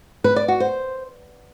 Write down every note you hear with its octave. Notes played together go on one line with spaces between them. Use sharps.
B4
D5
F#4
C5